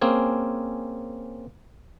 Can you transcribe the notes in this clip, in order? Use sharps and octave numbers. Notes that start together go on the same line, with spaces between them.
A#3 C4 C#4 G#4